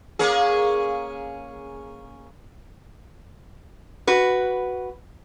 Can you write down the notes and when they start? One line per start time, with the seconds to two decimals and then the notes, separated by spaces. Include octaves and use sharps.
0.19 A#3 C#4 G#4
4.07 F#4 B4